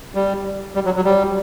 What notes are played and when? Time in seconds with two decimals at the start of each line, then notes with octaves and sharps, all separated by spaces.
0.15 G3
0.75 G3
0.85 F#3
0.96 F#3
1.05 G3